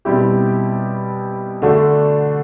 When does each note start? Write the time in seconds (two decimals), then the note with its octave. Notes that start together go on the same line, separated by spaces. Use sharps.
0.05 B2 G3 C4 E4 G4
1.62 D3 A3 D4 F#4